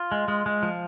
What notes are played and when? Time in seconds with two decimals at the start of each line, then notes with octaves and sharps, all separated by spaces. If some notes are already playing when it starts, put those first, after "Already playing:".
Already playing: F4
0.12 G#3
0.28 G#3
0.46 G#3
0.63 F3